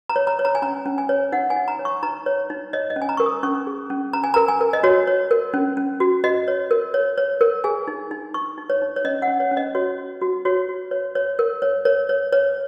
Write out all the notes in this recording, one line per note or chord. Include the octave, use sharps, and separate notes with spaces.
A#5
C#5
A#5
C#5
A#5
G#5
C#4 A#5
C#4
G#5
C#5
D#4 F#5
G#5
D#4
A#5
C#5
C#6
D#4 A#5
C#5
D#4
C#5 D#5
D#5
C#4
G#5
A#5
A#4 C#6
D#6
C#4 C#6
G#4
C#4
C#4 A#5
G#5
A#4 A#5
G#5
A#4
D#5
F#4 C#5
C#5
A#4
C#4
C#4
F#4
F#4 D#5
C#5
A#4
C#5
C#5
A#4
G#4 G#5
D#4
D#4
D#4 C#6
D#4
C#5
D#4
C#5
C#4 D#5
F#5
C#4
C#5
C#4
D#5
F#4 C#5
F#4
F#4
F#4 C#5
F#4
C#5
C#5
A#4
C#5
A#4 C#5
C#5
C#5